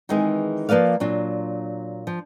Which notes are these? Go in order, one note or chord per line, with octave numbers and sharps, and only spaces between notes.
D#3 E3 G#3 C4 G#4
F3 A#3 B4 D5 F5
A#2 F#3 D4 F4
F3